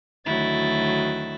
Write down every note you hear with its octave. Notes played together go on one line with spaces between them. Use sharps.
D2 D#3 F#3 E4 A6